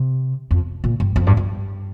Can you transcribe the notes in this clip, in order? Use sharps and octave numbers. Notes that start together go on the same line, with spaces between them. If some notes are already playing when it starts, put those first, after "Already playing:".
Already playing: C3
F2
A#2
G2
F2
G2
G2